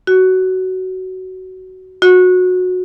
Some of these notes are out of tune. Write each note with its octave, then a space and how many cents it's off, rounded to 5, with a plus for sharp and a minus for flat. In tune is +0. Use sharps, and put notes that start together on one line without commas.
F#4 +15
F#4 -20